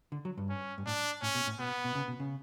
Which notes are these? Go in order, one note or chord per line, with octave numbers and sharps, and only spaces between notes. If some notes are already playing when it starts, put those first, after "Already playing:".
D3
F#3
G2
C#4
G2
A2 D4
A2 C#4
B2
A2
B2 B3
B2
C#3
B2
C#3